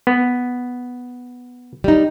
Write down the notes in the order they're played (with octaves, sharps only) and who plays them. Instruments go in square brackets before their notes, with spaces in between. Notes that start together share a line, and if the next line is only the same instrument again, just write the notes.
[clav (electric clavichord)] B3
[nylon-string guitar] G3 D#4